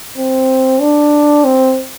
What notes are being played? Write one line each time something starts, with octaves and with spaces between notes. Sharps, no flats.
C4
D4
C4